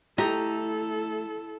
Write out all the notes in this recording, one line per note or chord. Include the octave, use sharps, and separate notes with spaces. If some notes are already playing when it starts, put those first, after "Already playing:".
A3 E4 G4 A4 D#5 A#5